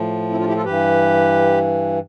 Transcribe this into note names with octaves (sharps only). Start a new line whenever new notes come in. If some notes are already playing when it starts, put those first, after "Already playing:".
Already playing: A2 F3
C4 E4
D4 F4
E4 G4
F4 A4
G2 E3 G4 B4